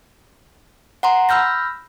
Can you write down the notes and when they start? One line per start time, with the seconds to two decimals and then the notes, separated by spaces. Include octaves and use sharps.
1.03 F#5 A#5 C6
1.29 B5 E6 F6 G6 A#6